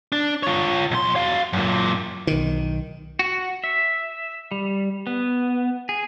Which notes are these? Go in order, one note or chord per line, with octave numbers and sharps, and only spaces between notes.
D4
F4 C#5
B1 C6
F#4 F5
F#2 A#2
B1 D#3
F#4
E5
G3
B3
G#4